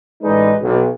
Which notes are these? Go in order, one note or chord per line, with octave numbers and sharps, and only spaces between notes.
A1 G#3 D#4 B4 D5
B1